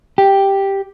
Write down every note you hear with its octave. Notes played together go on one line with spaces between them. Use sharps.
G4